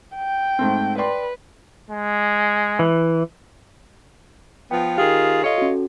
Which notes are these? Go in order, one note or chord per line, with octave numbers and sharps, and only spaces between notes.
G5
G#2 A3 C4
B4 D5 G5 C6
G#3
E3
F3 B3 G5
D#3 F4 G4 G#4 F5
F4 A4 C#5 D#5
C#4 F#4